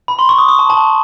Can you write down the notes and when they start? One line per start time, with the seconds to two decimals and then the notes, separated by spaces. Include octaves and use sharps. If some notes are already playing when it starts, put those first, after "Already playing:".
0.08 B5
0.19 C6
0.29 C#6
0.38 D#6
0.49 D#6
0.59 A5
0.70 A5